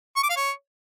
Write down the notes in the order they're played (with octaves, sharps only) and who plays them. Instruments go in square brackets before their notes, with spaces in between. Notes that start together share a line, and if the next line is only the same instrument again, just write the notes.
[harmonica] C#6
D6
F5
C#5